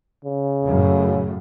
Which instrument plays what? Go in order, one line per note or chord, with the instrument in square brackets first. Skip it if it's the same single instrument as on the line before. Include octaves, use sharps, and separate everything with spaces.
[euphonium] C#3
[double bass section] F#2 A2